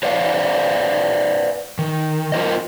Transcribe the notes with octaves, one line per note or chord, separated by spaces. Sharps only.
B4 C5 D5 F5 F#5
D#3
F4 A#4 C5 D#5